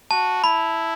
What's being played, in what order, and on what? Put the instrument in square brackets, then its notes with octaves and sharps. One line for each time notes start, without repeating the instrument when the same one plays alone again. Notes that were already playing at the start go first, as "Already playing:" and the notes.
[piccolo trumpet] F#4 [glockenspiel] A5
[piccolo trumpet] E4 [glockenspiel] B5